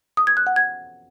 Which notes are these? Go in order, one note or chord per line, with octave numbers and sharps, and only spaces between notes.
D#6
G#6
F#6
F#5
G#6